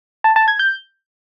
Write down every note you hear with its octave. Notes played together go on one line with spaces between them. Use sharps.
A5
A5
G#6
G6